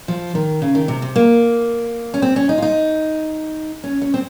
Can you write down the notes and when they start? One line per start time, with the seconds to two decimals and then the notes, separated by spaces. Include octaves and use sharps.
0.08 F3
0.35 D#3
0.62 C#3
0.75 D#3
0.88 C3
1.02 C3
1.16 A#3
2.14 C#4
2.22 C4
2.36 C#4
2.49 D#4
2.58 F4
2.62 D#4
3.84 C#4
4.02 C#4
4.14 C4